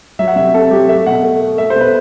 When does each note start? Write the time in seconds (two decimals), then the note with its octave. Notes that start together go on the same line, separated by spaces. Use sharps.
0.19 F#3 E5
0.28 F#5
0.36 C3 E5
0.54 C4 A4
0.71 F#3 G4
0.88 A3 E5
1.06 B2 F#5
1.23 A3
1.40 A3
1.58 A3 E5
1.70 C5
1.76 B2 B4